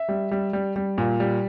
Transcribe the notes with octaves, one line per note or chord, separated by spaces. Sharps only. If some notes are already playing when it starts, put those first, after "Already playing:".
Already playing: E5
G3
G3
G3
G3
A#2
G3